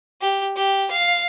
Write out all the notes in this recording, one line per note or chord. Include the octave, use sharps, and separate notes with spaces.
G4
G4
F5